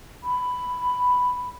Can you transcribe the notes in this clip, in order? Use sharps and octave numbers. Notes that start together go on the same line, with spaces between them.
B5